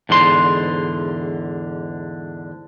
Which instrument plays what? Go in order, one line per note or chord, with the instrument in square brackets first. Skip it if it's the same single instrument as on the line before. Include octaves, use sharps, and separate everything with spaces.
[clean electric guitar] E2 G#2 D3 C6